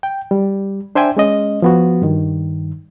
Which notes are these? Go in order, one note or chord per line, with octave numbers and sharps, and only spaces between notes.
G5
G3
D4 C5 E5 G5 G#5
G#3 C#4 D#5
F3 B3 F#4
G2 D#3